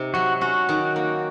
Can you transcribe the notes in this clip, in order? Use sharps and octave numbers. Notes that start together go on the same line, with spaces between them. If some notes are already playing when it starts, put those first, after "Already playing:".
Already playing: C3 D#4
F#3 F#4
C#4 F#4
D#3
A#3